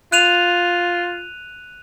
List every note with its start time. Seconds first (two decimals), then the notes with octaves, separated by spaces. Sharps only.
0.12 F4 F#6 D#7 F7